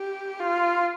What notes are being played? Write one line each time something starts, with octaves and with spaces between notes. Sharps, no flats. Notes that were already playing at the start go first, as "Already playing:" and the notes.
Already playing: G4
F4